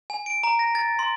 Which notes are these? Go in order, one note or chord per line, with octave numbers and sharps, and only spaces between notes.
G#5
D7
A#5
A#6
A6
C6